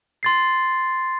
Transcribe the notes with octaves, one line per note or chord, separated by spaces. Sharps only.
C6 A6 C7